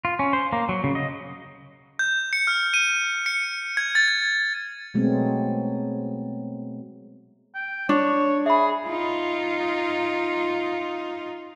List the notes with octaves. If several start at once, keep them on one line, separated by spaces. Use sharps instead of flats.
F4
C#4
C5
A#3
F#3
C#3
D#5
G6
C#7
F6
D#7
C#7
G#6
A6
G#6
B2 F#3 G#3 A3 B3 C4
G5
D4 C#5
G#4 E5 B5
D#4 F4